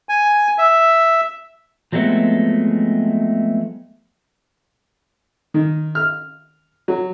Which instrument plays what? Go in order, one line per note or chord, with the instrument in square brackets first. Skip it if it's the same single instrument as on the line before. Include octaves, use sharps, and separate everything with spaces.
[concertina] G#5
E5
[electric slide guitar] F3 F#3 G#3 A3 B3 C4
[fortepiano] D#3
F6
F#3